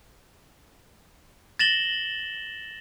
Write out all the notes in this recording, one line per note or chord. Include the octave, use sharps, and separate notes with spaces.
A6 A#6 E7 F#7 G7